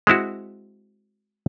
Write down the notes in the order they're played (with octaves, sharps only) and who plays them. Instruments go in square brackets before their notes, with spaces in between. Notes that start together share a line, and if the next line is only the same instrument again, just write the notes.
[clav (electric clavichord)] G#3 C4 E4 F#4